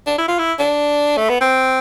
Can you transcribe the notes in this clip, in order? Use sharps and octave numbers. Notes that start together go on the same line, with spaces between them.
D4
E4
F4
E4
D4
A3
B3
C4